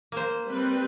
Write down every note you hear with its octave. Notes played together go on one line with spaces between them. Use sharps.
A#3 C5
G3 C4 B4